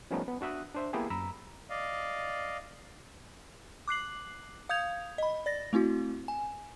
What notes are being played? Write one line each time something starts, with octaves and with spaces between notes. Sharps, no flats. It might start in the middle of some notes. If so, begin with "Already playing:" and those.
F3 G3 A3 B3 C#4 D#4
B3
D4 F#4 E5 D#6 F#6
D4 C5 E5
A#3 B3 E4 G4 G#4
F#2 A#5 B5 E6
D5 D#5 F5
D6 F#6 C7 F#7
F5 D#6 G6 G#6 F7
D#5 B5
D5 A6 A#6
A3 C4 E4 F#4
G#5